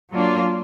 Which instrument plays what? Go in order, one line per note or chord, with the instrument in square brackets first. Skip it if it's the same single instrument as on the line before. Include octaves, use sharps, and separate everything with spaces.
[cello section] F#3 A#3 D4 F4